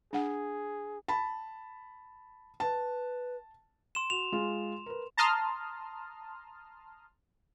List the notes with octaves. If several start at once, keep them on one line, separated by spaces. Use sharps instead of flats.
D4 G#4 F#5
A5 B5
B4 A5
C6 E7
F#4 F7
G#3 F4
A#4 B4
A5 A#5 C6 D#6 F6